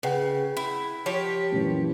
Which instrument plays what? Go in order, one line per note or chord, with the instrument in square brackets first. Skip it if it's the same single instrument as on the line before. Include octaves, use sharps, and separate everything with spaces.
[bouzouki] C#3 [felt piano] B4 F#5 G5
[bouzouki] E4
F3 G4 C#5
[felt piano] F#2 A#2 E3